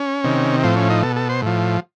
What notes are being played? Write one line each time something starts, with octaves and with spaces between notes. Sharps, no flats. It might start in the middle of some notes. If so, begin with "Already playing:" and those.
Already playing: C#4
C3 D#3
A2 F3 C4
C#4
D#4
B2 A4
A4
C5
A2 F3